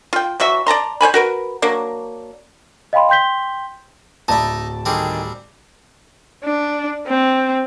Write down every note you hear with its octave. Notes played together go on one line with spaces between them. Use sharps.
F4 G5
E3 F#3 F#4 E5
D5 A5 A#5 C6
C5 C#5 G#5 B5
F#4 A#4 B4
F#3 A#3 D4
D#5 F5 G5 B5 C6
G5 C6 G6 B6 G7
D1 D#4 D5 E5 A5 B5
D#3 G3 C4 D4 G#4 A4
D4
C4